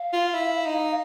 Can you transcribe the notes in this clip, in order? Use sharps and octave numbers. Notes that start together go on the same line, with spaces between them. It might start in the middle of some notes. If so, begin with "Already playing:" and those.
Already playing: F5
F4
E4
D#4